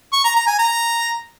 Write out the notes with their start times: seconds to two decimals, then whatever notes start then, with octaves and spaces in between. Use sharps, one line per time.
0.13 C#6
0.24 A#5
0.36 A#5
0.47 G#5
0.58 A#5